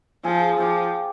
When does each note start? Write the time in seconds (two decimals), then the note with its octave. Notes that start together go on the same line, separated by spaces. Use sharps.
0.25 F3 G#4
0.59 F3 G4